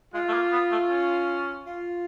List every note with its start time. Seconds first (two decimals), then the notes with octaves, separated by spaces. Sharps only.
0.13 G#3 F4
0.29 A3
0.33 A#3
0.52 B3
0.72 A3
0.90 C#4
1.66 F4